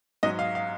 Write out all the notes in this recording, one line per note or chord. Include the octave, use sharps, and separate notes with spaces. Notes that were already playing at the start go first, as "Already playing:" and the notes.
G#2 F#3 D#5
F5
F5